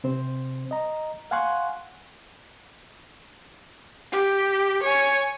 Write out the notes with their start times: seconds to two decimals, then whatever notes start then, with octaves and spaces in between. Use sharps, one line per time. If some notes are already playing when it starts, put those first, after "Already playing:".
0.04 C3 C4 C5
0.71 D#5 A#5
1.31 F5 F#5 G#5 C6 C#6 F#6
4.12 G4
4.83 C#5 G#5